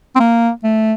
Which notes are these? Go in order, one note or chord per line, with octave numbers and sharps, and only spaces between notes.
C4
A#3
A3